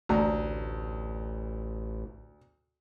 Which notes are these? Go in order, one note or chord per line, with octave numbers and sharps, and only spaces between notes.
A1 D2 A#5